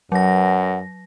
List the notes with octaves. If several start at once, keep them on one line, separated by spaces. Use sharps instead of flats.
F#2 F#3 F#5 A#6